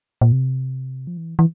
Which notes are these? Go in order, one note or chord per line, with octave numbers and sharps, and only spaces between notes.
A#2
C3
F3
E3
E3